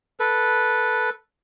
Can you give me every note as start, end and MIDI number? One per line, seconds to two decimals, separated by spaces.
0.20 1.10 69
0.20 1.10 71